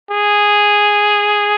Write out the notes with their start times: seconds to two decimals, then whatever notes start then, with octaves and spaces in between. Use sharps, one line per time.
0.11 G#4